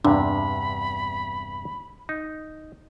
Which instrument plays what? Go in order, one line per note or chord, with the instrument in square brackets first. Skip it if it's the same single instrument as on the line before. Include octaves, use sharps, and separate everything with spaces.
[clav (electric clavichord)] E2 G2 C3 [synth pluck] D4 [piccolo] B5
[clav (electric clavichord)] D#4